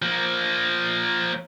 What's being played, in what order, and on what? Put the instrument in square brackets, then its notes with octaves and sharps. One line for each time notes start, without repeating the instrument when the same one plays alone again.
[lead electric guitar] F3 A#3